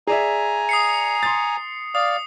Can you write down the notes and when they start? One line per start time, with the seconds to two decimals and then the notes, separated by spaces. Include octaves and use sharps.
0.07 G#4 D5 E5 G#5 A#5
0.69 D#6 C7 C#7
1.23 C6 A6
1.95 D5 F5 D#6